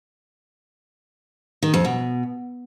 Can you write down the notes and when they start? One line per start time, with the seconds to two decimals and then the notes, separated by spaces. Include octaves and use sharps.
1.63 D#3
1.74 F2
1.85 B2